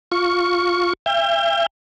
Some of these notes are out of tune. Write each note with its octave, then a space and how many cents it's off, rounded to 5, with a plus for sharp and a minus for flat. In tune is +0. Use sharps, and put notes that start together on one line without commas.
F4 +10 C#6 +5
E5 +40 G5 +35